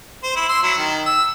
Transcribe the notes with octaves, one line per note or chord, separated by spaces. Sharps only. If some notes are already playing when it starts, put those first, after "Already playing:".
C5
E4
C6 E6
F#3 E4
D#3
E6